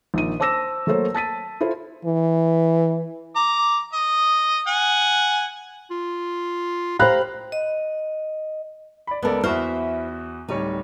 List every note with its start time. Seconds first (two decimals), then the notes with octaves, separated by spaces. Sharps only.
0.14 A#1 D#3 D#7
0.40 C5 A5 D6 E6 A#6 E7
0.87 F#3 A3 A#3 A4 C5 C#5
1.14 A5 A6 B6 D#7
1.61 E4 F4 A4 C5
2.05 E3
3.36 A#5 D6
3.93 D#5
4.67 F#5 G#5
5.91 F4
6.99 G4 C5 F5 A#5 B5 F#6
7.52 D#5
9.07 D5 B5
9.23 C#2 B3 A4 A#4 D5
9.44 E2 E4 F#4 C5 E5 F6
10.49 D1 G3 D#4 C#5